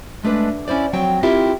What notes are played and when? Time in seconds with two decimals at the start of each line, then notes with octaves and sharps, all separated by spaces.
0.23 G#3 A3 D4 B4
0.50 D2
0.68 C#4 E4 C5 D5
0.93 F3 F#3 C4 G5
1.23 C4 E4 F4 G4 A#4 E5